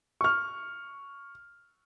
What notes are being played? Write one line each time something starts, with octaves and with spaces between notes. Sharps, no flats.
C#6 F6